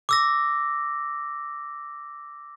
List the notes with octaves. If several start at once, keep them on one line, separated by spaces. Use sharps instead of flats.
D6 E6 A#6